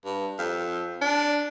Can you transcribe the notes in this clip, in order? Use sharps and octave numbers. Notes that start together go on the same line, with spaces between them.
G2
F2
D4